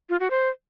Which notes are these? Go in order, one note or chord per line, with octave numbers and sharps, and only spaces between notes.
F4
F#4
C5